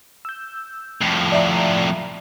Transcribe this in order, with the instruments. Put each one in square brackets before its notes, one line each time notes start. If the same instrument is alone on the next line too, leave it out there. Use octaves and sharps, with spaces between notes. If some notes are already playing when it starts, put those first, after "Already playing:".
[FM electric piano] E6 G6
[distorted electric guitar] F2 A2
[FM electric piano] D5 E5 A#5